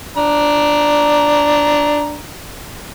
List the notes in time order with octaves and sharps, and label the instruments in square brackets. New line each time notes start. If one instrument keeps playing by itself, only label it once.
[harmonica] D4 A#5